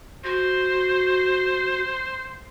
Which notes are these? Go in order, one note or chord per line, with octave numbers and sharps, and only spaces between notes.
F#4 C5